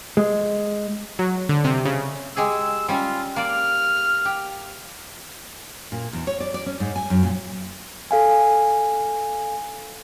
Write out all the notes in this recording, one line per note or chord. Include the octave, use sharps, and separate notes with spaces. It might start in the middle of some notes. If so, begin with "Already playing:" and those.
G#3
F#3
D3
C3
C#3
G#3 G4 G#4 E6
G3 C#4 F4
A#3 D5 F6
G4
A#2
E2
C#5
D5
D5
C#4
G#2
G#5
F#2
A#2
A4 F5 G#5